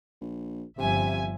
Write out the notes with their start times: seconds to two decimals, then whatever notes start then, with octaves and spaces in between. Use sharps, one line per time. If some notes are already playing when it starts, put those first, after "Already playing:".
0.21 A#1
0.78 G1 C3 F3 G3 E5 G#5